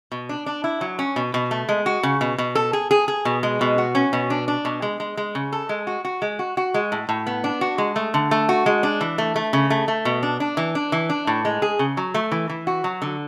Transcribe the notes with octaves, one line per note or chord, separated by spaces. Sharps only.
B2
D4
D4
E4
F#3
C#4
B2
B2
A3
G#3
F#4
C#3
B2
B2
A4
G#4
G#4
G#4
B2
G#3
B2
F#4
C#4
B2
D4
D4
B2
G#3
G#3
G#3
C#3
A4
G#3
F#4
F#4
G#3
F#4
F#4
G#3
A2
A2
B3
D4
F#4
G#3
A3
D3
A3
F#4
G#3
D4
E3
A3
A3
C#3
A3
A3
B2
D4
D4
E3
D4
E3
D4
A2
G#3
G#4
C#3
F#3
A3
E3
E3
F#4
F#3
D3